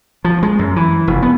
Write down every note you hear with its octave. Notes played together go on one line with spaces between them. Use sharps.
F3
G#3
F#2
E3
F1
B3